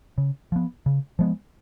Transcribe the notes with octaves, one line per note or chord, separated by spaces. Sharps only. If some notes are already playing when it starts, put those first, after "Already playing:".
C#3
F3 B3
C#3
F3 G#3 B3